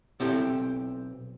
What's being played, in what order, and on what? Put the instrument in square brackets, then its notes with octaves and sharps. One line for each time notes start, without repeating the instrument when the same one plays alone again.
[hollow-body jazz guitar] B1 C4 E4 G4 A4